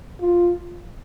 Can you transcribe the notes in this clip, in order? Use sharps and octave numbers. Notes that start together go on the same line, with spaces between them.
F4